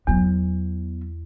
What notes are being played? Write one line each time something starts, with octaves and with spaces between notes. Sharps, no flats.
E2 F#3 B3